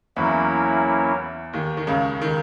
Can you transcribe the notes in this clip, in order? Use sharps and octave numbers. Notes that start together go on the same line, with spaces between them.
E2 E3 F#3 A#3 C#4 E4
D#2 D#3
D#3
C#2 C#3
D#3